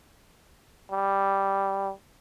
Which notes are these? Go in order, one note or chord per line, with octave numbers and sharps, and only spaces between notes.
G3